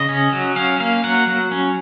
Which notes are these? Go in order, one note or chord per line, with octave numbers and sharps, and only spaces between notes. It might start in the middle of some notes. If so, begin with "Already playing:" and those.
Already playing: C#3 D#5
C#4
F#3
C#4 F5
A#3 F5
F#3 F#5
F#3
C#4